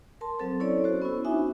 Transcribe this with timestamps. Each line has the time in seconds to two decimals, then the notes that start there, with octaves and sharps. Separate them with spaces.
0.21 A#4 A5 C6
0.39 F#3 C4 A4 C5
0.60 C#4 E4 A4 C#5 D5
0.84 F#4 C5
1.02 B3 C#4 E4
1.25 D4 D#4 F#4 E5 G#5